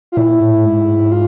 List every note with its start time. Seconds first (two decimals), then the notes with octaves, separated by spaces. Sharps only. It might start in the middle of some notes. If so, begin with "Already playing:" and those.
0.12 F4
0.17 A#2 E4
0.40 A2
0.64 G#2
1.12 F4